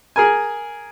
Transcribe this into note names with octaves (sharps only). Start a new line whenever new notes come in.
G#4 A#4 G#5